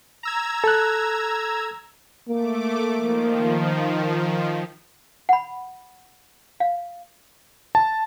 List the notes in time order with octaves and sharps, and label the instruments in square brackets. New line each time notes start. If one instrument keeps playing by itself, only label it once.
[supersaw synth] A#5 E6 G#6
[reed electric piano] A4 F#6
[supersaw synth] A3 D6 [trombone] A#3
[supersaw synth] D#3 F3
[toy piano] F#5 B5
F5
[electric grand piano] A5